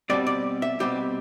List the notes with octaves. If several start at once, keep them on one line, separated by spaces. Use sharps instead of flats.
B2 G3 C4 D5
D5
E5
B2 G3 C4 G4